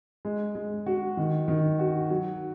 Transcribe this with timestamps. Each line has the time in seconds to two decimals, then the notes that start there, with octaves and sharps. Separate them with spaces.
0.25 G#3
0.55 G#3
0.86 F#4
1.17 D#3
1.48 D#3
1.79 F#4
2.10 F#3